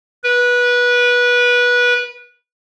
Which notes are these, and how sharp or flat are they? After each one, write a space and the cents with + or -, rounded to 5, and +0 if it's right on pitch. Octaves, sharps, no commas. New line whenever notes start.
B4 -20